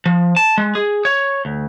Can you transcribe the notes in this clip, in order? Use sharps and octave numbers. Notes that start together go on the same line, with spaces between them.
F3
A5
G#3
G#4
C#5
D2